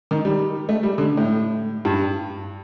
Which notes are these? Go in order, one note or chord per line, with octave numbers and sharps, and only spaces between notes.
D#3
G3
A3
G3
D3
A2
G2